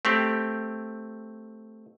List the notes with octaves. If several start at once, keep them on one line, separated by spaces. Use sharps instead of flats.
A3 C4 G4